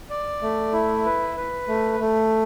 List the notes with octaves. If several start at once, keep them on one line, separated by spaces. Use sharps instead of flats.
D5
A3
E4
B4
B4
A3
A3